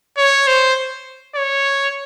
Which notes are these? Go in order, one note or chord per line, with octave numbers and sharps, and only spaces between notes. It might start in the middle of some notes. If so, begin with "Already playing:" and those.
C#5
C5
C#5